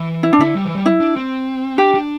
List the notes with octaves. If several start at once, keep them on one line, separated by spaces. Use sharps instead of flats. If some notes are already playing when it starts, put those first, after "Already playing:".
Already playing: E3
E4
D4
D3 E4
G3
E3
G3
E4
D4
C4
D4 G4
D4